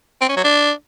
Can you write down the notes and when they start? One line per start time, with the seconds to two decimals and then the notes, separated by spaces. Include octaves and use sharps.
0.21 C4
0.29 C#4
0.36 F#3
0.44 D4